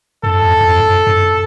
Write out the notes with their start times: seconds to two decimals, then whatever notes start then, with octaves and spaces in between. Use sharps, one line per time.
0.23 F#2 A4
0.42 F2
0.61 F2
0.79 F#2
1.07 F#2